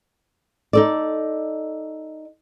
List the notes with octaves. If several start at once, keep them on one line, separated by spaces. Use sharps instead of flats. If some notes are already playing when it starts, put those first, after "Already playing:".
D#4 A4 D5